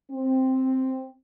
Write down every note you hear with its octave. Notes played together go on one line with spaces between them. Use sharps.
C4